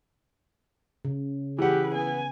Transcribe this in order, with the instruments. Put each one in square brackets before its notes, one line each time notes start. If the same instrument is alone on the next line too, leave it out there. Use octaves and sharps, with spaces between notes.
[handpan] C#3
[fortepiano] E3 F#5 [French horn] G4 [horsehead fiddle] G#4 B4
[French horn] B3 [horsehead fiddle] G#5